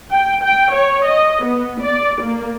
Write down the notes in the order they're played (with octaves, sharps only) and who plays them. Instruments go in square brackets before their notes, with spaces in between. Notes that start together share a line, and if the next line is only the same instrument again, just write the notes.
[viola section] G5
G5
C#5
D#5
B3
D5
A#3